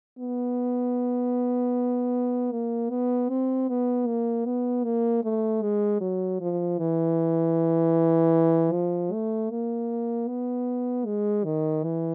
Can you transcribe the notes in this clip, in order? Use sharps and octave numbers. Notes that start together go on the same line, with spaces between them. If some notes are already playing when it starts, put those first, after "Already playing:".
B3
A#3
B3
C4
B3
A#3
B3
A#3
A3
G#3
F#3
F3
E3
F3
A3
A#3
B3
G#3
D#3
E3